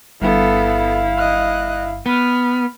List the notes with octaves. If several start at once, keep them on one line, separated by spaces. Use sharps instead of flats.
G1 G2 B3 E4 A4 F5
D#5 F#6
B3 B5 F6